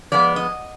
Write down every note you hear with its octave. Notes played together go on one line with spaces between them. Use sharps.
F3 G#3 B3 D5
D#5